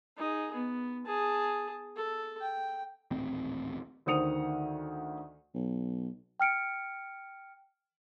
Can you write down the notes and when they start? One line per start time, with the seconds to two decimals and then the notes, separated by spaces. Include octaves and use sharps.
0.18 D#4 G#4
0.54 B3
1.06 G#4 A5
1.96 A4
2.41 G5
3.11 D#1 A1 C4
4.06 D2 D#3 C5 D#6 C#7 F7
5.54 B1
6.40 G5 F6 C#7 D7